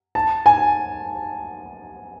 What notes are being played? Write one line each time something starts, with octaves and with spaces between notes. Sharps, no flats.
A5
G#5